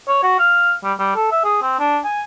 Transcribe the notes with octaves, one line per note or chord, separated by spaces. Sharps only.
C#5
F#4
F5
G3
G3
A4
E5
G#4
C4
D4
G#5